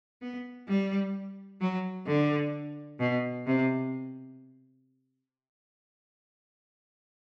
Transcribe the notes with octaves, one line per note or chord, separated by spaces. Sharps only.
B3
G3
F#3
D3
B2
C3